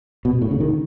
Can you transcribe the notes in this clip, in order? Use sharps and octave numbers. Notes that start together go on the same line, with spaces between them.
B2
A2
C#3
D#3